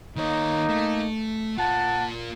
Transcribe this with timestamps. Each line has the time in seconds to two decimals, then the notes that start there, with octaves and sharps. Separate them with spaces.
0.16 D#3 A#3 D#4 C#5
0.69 A3
1.58 A#3 F4 F#5 A5